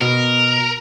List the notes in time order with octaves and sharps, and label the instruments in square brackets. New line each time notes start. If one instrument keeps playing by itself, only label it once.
[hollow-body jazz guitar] B2 [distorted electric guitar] A#4